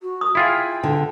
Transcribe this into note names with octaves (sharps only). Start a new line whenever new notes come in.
F#4
D#6
E4 F4 G#4 G5
D3